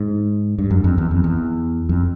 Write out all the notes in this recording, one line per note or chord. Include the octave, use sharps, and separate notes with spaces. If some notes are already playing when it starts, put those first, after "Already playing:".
Already playing: G#2
G2
F#2
F2
E2
F2
E2
F2